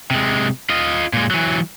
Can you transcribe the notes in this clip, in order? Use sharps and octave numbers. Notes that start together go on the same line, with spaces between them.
C3 G#3
F4 D#5
A#2 G#3
E3 F#3